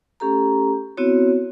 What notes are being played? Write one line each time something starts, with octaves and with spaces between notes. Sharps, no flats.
A3 C#4 G4 A4 A#5
B3 C4 E4 F#4 C#5